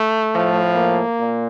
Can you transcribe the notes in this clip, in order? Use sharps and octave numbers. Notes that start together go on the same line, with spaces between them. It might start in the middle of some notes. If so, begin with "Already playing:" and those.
Already playing: A3
A2 F3
A#3
A#2